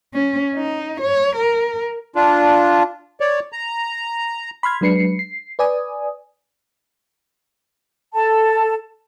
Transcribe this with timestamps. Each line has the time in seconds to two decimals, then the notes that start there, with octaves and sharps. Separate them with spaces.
0.13 C#4
0.55 D#4
1.01 C#5
1.36 A#4
2.15 D4 F4
3.20 C#5 D5
3.52 A#5
4.63 B5 C6 F6 G#6
4.81 F#3 G#3 D4 B4 C7 C#7
5.19 C7
5.59 B4 D5 G#5 D#6
8.14 A4 A5